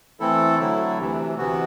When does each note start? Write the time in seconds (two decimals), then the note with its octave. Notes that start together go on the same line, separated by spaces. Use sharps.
0.20 E3 A3 C4 E4 A4
0.60 D3 F#3 A3 E4
0.99 D2 C3 E3
1.38 C3 E3 B3 F#4